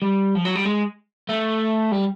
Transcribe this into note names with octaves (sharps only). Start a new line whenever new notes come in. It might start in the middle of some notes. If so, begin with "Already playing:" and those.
G3
F3
F#3
G3
G#3
A3
G3